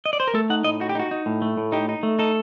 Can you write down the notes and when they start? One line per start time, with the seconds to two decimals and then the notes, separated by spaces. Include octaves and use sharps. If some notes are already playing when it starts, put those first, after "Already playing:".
0.06 D#5
0.13 D5
0.20 C5
0.28 A#4
0.34 A3 A4
0.50 D#4 F#5
0.64 A2 D#5
0.80 D#4 F#4
0.89 G4
0.95 D#4 F#4
1.11 D#4
1.26 A2
1.42 A3
1.57 A2
1.72 D#4 G4
1.89 D#4
2.03 A3
2.19 D#4 A4